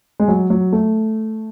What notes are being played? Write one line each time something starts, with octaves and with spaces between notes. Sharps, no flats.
G#3
F#3
F#3
A3